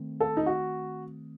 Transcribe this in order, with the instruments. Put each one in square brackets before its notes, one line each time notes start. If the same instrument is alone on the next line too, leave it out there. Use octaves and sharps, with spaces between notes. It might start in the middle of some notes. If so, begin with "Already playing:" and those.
Already playing: [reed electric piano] D#3 A3 C4
[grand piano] A4
D#4
F#4